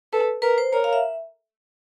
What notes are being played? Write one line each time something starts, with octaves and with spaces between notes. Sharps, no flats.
A4 B4
A#4 B4
C5
A#4 C#5
F5
E5